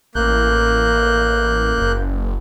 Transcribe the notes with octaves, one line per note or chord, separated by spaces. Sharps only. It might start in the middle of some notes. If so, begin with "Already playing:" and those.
A1 A#3 F#6 G6
F#1